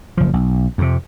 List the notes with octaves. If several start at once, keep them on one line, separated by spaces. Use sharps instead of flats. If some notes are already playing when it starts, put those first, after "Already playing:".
F#1 F3
B1
F2 C3